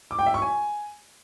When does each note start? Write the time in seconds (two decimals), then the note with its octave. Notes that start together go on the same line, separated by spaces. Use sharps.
0.11 D6
0.19 G5
0.26 E5
0.34 C#6
0.42 G#5